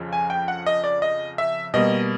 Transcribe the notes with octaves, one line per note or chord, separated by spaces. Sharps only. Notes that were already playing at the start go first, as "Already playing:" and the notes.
Already playing: F2 C#3 F3
G#5
G5
F#5
D#5
D5
D#5
E5
B2 G3 A#3 D#5